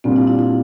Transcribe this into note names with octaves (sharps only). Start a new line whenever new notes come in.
A#2 G3 C4 D4 F4
E4
E4
E4